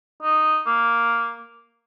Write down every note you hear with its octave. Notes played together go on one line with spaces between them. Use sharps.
D#4
A#3